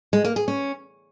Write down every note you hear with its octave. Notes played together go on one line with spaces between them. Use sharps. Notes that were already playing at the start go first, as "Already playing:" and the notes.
G#3
A#3
G#4
C#4